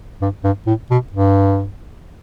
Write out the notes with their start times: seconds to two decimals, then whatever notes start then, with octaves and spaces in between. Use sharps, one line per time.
0.22 G2
0.44 G2
0.67 A2
0.91 B2
1.12 G2